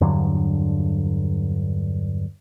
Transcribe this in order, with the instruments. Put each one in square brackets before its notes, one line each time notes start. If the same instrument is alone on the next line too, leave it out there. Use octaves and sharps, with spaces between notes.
[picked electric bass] E2 G2 D3 F#3